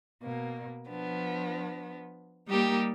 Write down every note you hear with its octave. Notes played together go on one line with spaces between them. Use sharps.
B2 A#3
F3 B3 D4
G3 A#3 D#4 G4 A#4